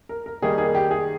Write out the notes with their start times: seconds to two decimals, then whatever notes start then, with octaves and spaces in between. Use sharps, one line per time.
0.09 A#4
0.26 A#4
0.42 D#3 G3 A#3 D#4 G#4
0.58 G#4
0.75 G4
0.91 G#4